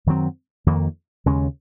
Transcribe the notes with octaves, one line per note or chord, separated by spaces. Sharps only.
F#2 D#3 F#3 C4
F2 D#3 A#3
D#2 C#3 G#3 C#4